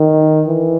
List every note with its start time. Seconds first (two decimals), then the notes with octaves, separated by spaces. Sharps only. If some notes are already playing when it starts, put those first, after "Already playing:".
Already playing: D#3
0.48 E3